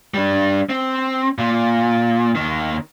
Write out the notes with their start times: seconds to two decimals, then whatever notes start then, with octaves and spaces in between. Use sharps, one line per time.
0.14 G3 D4
0.69 C4
1.38 A#2
2.35 D#2 D#3